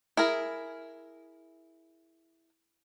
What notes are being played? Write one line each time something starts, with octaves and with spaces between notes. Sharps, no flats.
E4 G#4 A#4